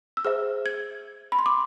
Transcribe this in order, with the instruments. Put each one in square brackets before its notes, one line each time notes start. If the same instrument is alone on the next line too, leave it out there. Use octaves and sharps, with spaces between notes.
[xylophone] E6
G#4 C5 E5 F6
G#6
B5
C6
D6